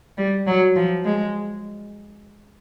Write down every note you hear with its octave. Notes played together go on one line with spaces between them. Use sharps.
G3
F#3
F3
G#3